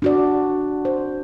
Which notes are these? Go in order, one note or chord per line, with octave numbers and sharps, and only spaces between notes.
D4 F#4 D5
C5